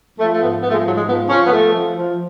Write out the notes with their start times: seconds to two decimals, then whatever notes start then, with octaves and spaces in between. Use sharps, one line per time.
0.18 F3 A3
0.32 A3
0.40 G#2 B3
0.62 F3 B3
0.69 A3
0.73 G#3
0.85 G#2 F#3
0.96 G#3
1.07 F3 B3
1.29 F3 C#4
1.46 B3
1.52 F3 A3
1.74 F3
1.96 F3